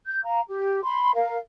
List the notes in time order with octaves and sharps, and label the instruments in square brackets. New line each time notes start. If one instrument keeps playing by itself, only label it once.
[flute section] G6
F5 A#5
G4
B5 C6
A#4 F5